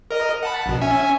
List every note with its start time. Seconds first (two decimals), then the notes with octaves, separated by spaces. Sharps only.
0.11 A#4 D#5
0.43 F#5 A5 B5
0.66 A#1 B2
0.81 C#4 E5 G#5